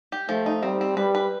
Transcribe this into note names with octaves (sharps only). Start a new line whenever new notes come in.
G4
F3 A3
D#4
G3 C4
C4
G3 B4
B4